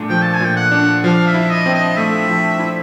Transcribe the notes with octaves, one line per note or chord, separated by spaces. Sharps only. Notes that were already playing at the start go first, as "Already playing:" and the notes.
Already playing: A#2 A3 D4
F3 G5
A5
G#5
A#2 G5
F#5
D4
F3 F5
E5
E4
D#5
C4
D#5
A3 E5
F3
E4